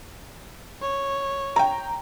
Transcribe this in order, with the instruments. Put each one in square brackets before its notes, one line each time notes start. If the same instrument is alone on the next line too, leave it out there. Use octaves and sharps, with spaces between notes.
[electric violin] C#5
[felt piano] G5 A#5